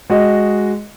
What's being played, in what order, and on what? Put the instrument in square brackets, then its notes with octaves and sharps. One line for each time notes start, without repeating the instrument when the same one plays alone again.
[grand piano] G#3 F#4 D#5